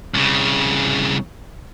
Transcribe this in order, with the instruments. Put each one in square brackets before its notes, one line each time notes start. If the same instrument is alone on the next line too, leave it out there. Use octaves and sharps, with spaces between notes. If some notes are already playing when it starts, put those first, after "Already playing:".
[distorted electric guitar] C2 C#3